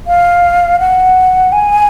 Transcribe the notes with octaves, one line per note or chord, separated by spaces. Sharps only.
F5
F#5
G#5